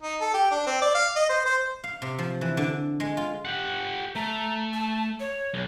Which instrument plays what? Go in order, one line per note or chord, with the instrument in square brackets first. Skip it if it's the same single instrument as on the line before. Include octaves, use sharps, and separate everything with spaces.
[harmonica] D#4
A4
G4
D4
C4
D5
F5
D#5
C5
C5
[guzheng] F5
C3
F3
E3
D3
G#3
F4
[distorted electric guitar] G4 F#5
[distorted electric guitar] A3 [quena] A#5
[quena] A5
C#5
[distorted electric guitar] B1